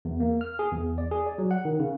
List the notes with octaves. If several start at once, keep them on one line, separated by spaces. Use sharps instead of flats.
E2
A#3
F6
G#4
E2
D5
G#4
D5
F#3
F#5
D#3
C#3